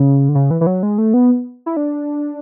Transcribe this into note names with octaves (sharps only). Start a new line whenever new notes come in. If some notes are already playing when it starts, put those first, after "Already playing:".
Already playing: C#3
D3
C#3
E3
E3
F#3
G#3
A3
B3
E4
D4